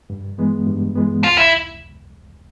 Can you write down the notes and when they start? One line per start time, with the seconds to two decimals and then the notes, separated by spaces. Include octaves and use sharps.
0.10 G2
0.38 E3 G#3 B3
0.67 G2
0.95 E3 G#3 B3
1.24 C#2 F4
1.38 E4